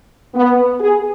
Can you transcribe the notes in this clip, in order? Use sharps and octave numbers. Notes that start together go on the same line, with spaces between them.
B3
G#4